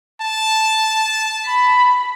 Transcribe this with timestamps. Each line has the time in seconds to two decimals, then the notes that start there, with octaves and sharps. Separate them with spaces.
0.21 A5
1.46 B5